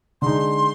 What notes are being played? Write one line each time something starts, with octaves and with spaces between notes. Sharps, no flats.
D3 G#3 D#4 C6